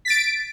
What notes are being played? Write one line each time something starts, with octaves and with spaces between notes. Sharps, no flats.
A6 B6 D7